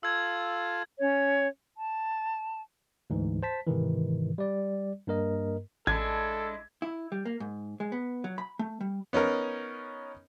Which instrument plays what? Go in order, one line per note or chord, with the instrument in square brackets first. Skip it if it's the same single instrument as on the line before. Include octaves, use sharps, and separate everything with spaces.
[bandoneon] F4 A4 F5 [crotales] E6 G#6
[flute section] C#4 C#5
A5
[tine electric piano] D2 G#2 E3
C5 A5 B6
G#2 C3 D#3 E3
G3 D5
G2 A#3 A#4 D#5
[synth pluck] A1 [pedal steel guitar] G#3 D4 E4 [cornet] A4 [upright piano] G#6
[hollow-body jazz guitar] E4
G3
A#3
G#2
G#3
B3
F#3
B5
A3
G3
[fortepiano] B3 C#4 D#4 A#4